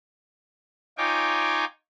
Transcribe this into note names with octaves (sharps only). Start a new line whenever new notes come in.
D#4 F4 C#5 G5 G#5 D6